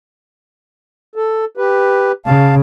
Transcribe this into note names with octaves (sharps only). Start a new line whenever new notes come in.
A4
G4 B4
C#3 F5 A5